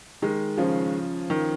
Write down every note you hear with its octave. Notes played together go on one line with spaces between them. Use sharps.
D#3 G#3
C#3 F3
D#3